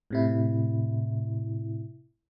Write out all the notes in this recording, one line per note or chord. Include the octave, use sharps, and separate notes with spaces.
A2 C3 E4